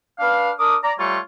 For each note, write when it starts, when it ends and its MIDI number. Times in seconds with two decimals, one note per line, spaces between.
0.19 0.51 62
0.19 0.51 71
0.19 0.51 77
0.59 0.76 62
0.59 0.76 70
0.59 0.76 86
0.59 0.76 87
0.83 0.93 74
0.83 0.93 82
0.99 1.18 55
0.99 1.18 57
0.99 1.18 65
0.99 1.18 73
0.99 1.18 85